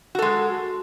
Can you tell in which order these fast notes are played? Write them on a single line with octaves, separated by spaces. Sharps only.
F#4 A4 G#3